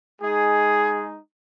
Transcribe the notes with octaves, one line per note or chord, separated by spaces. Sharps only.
G#3 D#4 G#4